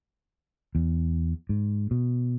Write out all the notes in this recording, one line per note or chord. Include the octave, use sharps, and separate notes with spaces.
E2
G#2
B2